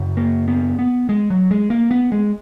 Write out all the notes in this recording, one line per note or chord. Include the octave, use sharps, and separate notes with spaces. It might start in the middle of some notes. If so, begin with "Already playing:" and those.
Already playing: F#2 C#3
A#3
B3
B3
G#3
F#3
G#3
A#3
B3
G#3